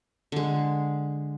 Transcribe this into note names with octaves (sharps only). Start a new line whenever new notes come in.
D3 G#3